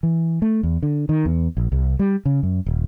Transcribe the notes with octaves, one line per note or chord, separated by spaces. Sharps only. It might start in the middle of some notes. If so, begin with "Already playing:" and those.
E3
A3
E2
D3
D#3
E2
A#1
C2
G3
C#3
F#2
D#1